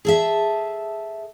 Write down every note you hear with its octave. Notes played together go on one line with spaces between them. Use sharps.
G#4 A4 E5